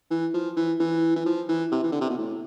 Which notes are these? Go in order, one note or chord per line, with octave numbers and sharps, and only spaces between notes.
E3
F3
E3
E3
E3
F3
E3
C3
E3
D3
C3
B2
A2